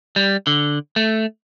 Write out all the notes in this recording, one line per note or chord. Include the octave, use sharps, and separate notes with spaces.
G3
D3
A3